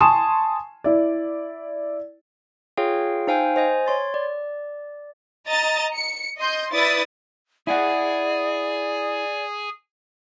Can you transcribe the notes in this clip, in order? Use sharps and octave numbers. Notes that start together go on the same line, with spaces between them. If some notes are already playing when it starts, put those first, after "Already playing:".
G#5 A5 C6 C#6 D#6 E7
E4 D5
F4 G#4 C#5 F5 G5
D#4 C5 F5 G5 G#5
C5 D#5 G#5
C#5 C6 A6
D5
D#5 A#5 A6
C#7
D#5 C6 G6
E4 B4 D5 D#6 A6
E4 G#4 D5 F#5 G#5